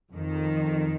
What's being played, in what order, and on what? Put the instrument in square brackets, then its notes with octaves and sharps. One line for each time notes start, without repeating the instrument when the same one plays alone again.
[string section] F2 D#3